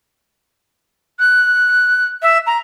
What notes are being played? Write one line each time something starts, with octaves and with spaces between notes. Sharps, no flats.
F#6
E5
A#5